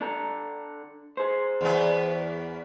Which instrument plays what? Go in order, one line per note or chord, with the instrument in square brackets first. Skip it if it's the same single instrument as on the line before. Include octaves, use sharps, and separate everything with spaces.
[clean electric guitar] D4 A4 A#5
G#4 C5
[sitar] E2 B3